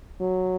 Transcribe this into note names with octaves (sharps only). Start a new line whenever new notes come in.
F#3